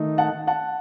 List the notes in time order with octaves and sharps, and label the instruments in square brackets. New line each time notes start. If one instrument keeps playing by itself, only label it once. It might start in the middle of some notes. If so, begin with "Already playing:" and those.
Already playing: [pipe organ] D#3 A3 D#4
[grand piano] F#5 A5
F#5 A5